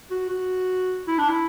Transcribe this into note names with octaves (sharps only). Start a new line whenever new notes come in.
F#4
F#4
E4
D4
E4